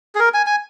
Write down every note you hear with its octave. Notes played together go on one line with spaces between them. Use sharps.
G#4
A#4
G#5
G#5